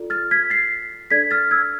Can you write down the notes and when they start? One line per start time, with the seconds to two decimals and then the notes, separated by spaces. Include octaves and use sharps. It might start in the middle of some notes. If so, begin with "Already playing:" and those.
Already playing: F4 A4 D5
0.10 F6 A6
0.31 G#6 B6
0.50 A6 C7
1.10 D4 A4 D5 G#6 B6
1.31 F6 A6
1.51 E6 G#6